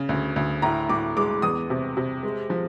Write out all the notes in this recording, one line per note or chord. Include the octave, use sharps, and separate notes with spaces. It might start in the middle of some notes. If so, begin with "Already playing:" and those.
Already playing: C#3
D2
D2
A2 A#5
A2 D6
G#3 D6
E2 D#6
C3
C3
G#3
F3